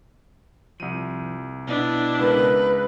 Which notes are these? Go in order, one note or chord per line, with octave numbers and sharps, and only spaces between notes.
C2 F3 D#7
B2 B3 D4 E4 D#5
C#2 A#4 B4